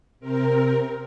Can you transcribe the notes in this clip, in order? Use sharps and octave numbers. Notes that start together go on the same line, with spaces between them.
C3 C4 A#4